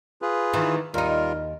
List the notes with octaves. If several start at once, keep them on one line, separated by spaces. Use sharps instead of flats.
F4 G#4 B4
D#3 E3
D#2 G3 D#4 F4 A#4